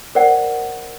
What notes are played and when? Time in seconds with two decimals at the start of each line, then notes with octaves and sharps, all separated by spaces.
0.15 A#4 C5 D5 F#5